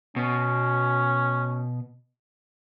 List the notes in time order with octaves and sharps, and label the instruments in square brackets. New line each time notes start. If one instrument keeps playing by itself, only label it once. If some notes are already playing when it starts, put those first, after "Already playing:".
[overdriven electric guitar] B2 [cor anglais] C#4